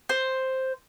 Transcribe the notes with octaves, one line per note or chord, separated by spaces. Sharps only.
C5